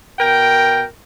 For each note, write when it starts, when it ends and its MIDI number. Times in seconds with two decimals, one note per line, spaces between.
0.19 0.84 47
0.19 0.84 70
0.19 0.84 79